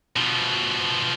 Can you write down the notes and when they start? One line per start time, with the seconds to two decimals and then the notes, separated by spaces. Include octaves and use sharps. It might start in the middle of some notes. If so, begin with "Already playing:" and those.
0.16 B2 F3